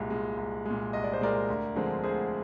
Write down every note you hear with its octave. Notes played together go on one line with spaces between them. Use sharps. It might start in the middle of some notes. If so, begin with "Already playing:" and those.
Already playing: C2 A#2 G#3
A#2 G#3
C2
A#2 G#3
C2 D#5
D5
C5
A#2 G#3 A#4 D5
D2
D3 F3 G#3 C4
D2 G#4 C5